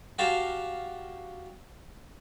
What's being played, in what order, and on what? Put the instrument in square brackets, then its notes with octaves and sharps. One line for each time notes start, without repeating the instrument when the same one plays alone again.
[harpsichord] F#4 G4 F5 A5 C6